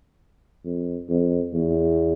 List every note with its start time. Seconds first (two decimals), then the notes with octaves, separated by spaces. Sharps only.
0.65 F2
1.09 F2
1.53 E2